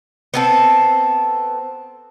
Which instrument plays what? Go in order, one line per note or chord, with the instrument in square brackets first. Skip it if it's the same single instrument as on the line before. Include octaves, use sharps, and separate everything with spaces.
[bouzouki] B3 C4 A4